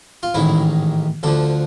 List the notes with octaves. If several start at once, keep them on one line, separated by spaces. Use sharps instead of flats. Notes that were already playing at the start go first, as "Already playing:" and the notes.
F4
A1 G#2 D#3 E4
D2 D3 F3 A4